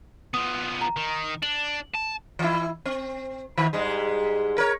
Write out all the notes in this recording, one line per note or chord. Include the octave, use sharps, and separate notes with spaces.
F3 B3 D#6
A#5
D#3
D4 F#7
A5
E3 E4
C4
D#3
G#2 G3 G#3
A#4 C#5